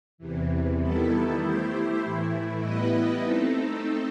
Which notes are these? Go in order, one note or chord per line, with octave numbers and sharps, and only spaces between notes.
E2 C3 E3
D#3 G3 B3 E4 A4
A3 E4 G4 C5
A2 E3 A3 E4
G3 B3 E4 B4 D#5
A3 C4 D#4 A4